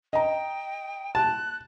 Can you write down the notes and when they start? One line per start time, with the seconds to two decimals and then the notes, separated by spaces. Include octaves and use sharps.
0.13 D#5 G5 A#5
1.15 A5 F#6